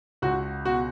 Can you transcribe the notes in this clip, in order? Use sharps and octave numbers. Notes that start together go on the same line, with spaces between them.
C#2 F#4
B2 F#4